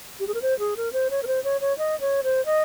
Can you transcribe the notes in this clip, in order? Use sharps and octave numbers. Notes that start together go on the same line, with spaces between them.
G4
G#4
A#4
C5
G#4
A#4
C5
C#5
A#4
C5
C#5
C#5
D#5
C#5
C5
D#5